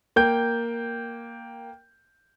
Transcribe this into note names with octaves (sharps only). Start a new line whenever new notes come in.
A#3 G5 G6